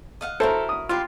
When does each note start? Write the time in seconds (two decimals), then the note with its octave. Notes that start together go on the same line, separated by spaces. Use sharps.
0.21 D#5 F5 F#5
0.40 E4 F#4 A4 A#4 C5
0.69 D#6
0.89 F4 G4 B4 C6